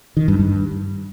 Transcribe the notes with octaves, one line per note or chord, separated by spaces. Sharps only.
D#3
G2
G2